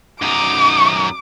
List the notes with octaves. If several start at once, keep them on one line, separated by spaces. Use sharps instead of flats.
F#2 D#4 D6